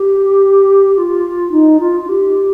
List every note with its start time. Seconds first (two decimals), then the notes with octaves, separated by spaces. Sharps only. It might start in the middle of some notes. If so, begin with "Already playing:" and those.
Already playing: G4
0.94 G4
0.97 F4
1.51 D#4
1.80 F4
2.00 F4
2.08 G4